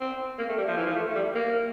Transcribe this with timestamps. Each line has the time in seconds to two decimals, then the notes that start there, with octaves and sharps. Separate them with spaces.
0.01 C4
0.38 A#3
0.49 A3
0.58 G3
0.68 F3
0.77 E3
0.86 F3
0.96 A3
1.06 A3
1.15 G3
1.35 A#3